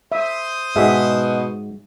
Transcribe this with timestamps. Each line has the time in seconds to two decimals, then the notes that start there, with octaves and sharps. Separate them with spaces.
0.12 C5 E5 D#6
0.76 G#2 B2 F#4 G#4 D#5 E5